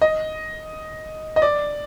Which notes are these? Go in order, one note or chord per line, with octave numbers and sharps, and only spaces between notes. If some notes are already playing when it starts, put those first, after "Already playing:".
D#5
D#5
D5